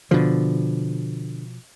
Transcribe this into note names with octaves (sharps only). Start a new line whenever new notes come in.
B2 D3 F3